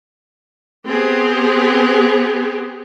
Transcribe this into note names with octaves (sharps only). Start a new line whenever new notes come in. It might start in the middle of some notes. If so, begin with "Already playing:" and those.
B3 C4 G4 G#4